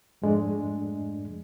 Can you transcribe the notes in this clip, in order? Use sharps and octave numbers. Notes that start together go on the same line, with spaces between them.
F2 G#2 F3 G#3 A3 D4